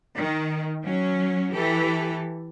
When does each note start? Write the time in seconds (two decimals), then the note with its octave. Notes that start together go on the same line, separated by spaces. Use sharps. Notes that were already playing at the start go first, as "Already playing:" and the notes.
0.17 D#3
0.84 F#3 C#4
1.53 E3 G4 A4